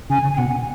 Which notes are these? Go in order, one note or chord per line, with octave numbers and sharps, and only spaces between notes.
C#3 G#5
G#5
B2 F#5